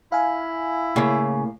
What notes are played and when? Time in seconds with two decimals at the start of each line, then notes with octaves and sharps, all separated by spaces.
0.12 E4 F5 G#5
0.96 A2 C#3 A#3